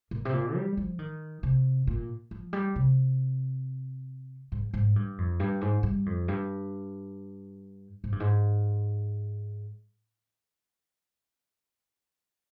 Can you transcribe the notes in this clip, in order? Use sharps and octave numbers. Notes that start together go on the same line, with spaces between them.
A#2
C3
A#2
G3
F3
D#3
C3
A#2
F3
G3
C3
G#2
G#2
G2
F2
G2
G#2
G2
F2
G2
G#2
G2
G#2